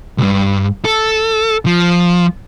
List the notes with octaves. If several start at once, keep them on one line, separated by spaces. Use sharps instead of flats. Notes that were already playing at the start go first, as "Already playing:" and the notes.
C2 G2
A4
F3